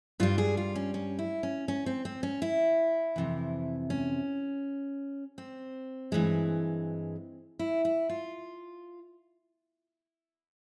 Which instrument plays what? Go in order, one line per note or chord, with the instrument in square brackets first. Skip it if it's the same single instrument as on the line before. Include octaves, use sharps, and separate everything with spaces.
[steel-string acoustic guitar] G2 G3 F4
G#4
F4
C#4
C#4
E4
C#4
C#4
C4
C4
C#4
E4
F2 C3 E3
C#4
C4
G2 E3 G#3
E4
E4
F4